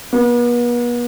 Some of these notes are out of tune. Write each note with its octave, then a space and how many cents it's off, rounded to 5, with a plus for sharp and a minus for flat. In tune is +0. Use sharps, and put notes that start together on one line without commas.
B3 -40